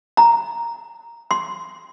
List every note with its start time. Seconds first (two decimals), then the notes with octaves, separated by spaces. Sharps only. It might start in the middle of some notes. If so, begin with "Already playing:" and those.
0.17 A#5
1.31 C6